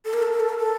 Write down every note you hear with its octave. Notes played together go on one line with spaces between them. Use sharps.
A4
A#4
A4
A#4
A4
A#4
A4